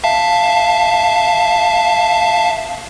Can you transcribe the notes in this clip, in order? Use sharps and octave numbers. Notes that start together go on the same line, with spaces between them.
E5 F5 A5